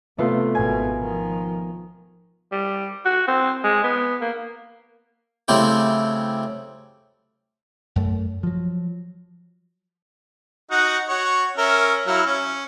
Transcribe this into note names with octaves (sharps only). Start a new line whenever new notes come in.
C3 A3 B3 F4
G#1 B2 G#5
D#3 F3
G3
F#4
C4
G#3
B3
A#3
C#3 F#3 A3 C4 E4 G4
F#2 A3
F3 F#3
D#4 F#4 F#5
F#4 C#5
C#4 A#4 E5
F#3 E4 F5
C#4